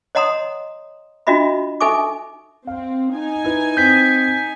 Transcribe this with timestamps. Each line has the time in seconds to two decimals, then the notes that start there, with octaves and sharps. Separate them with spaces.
0.15 C#5 D#5 F#5 A#5 C6 D#6
1.27 D4 F4 F#4 D#5 E5 B5
1.81 D#4 A4 E5 G#5 C#6 D6
2.67 C4 F5
3.14 D#4 G#5
3.44 E4 B4
3.77 C4 G6 B6